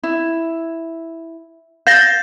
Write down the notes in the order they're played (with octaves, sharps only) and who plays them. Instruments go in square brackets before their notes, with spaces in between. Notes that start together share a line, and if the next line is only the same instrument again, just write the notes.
[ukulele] E4
[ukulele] F5 [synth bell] G6 A6 A#6